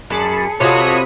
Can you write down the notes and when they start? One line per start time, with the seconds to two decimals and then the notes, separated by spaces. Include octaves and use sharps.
0.10 F#2 G#4 A5 B5 C#7
0.60 C3 F4 F#4 A4 C#5 D#5 B5 D#6